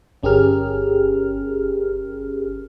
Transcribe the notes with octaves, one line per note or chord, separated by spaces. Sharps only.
G1 C#4 G4 G#4 A#4 F6